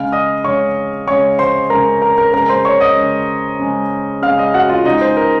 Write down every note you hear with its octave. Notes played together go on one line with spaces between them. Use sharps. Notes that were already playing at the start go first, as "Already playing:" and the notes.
Already playing: C#3 G#3 F5 F6
D#5 D#6
C#3 G#3 C#5 C#6
C#3 G#3 C#5 C#6
C5 C6
C#3 G#3 A#4 A#5
A#4 A#5
A#4 A#5
C#3 G#3 A#4 A#5
C5 C6
C#5 C#6
D#5 D#6
C#3 G#3
C#3 G#3
C#3 G#3 F5 F6
D#5 D#6
F#4 F#5
F4 F5
C#3 G#3 D#4 D#5
C5
A#4